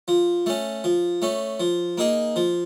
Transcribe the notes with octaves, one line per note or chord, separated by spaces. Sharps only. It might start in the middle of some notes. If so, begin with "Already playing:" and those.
F3
A3 C#4
F3
A3 C#4
F3
A#3 D#4 G#4
F3